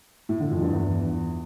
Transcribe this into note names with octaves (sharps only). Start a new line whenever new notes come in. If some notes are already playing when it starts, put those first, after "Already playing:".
A2
D3
F2
G2
E2